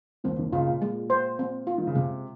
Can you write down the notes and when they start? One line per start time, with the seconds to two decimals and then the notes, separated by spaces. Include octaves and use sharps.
0.24 D#2 D#3 C4
0.39 D#2 D#3
0.53 C#2 C#3 F4
0.68 A#2
0.82 G#3
1.10 C5
1.39 C4
1.67 F4
1.78 D#3
1.87 C#3
1.95 C3 G#3